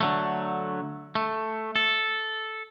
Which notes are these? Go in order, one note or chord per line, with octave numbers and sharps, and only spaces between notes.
D3 F#3 A3
A3
A4